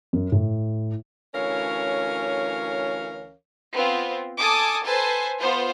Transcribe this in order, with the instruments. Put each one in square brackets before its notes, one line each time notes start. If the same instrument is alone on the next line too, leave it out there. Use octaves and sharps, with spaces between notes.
[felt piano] F#2
A2
[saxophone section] D2 E3 C#4 A#4 C#5 F5
[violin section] B3 C4 F4
A4 G#5 A5 D6 D#6
A4 B4 C5 G#5 A5
B3 F4 C5